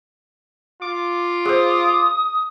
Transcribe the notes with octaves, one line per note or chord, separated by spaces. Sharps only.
F4 D6
G#4 C5 D#6